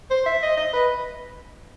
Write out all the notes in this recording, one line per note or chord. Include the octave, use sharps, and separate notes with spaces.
C5
E5
D#5
D#5
B4